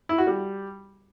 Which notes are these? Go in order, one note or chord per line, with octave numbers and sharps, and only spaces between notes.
E4
F#4
G3